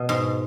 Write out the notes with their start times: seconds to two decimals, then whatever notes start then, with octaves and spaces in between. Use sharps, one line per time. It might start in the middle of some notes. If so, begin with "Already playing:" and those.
Already playing: B2
0.09 G#2